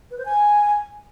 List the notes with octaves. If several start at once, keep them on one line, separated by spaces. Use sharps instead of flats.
B4
C5
G#5